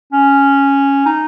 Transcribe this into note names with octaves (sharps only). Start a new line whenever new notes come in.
C#4
D#4